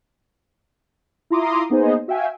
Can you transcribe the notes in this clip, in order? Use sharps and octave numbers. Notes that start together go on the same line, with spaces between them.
E4 F4 A#5 C6 D6 D#6
A#3 B3 D#4 G#4 C5 D#5
F#4 E5 F5 G5 G#5